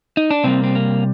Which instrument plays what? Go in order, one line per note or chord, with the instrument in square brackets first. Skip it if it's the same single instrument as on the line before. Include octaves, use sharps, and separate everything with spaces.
[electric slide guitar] D#4
D4
C3 G3 A#3 C4
C4
A#3